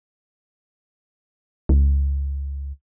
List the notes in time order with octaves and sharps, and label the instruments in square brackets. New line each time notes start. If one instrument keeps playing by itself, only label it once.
[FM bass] C#2